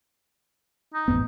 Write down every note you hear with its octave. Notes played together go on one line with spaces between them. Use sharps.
D#4
A1 F2 B3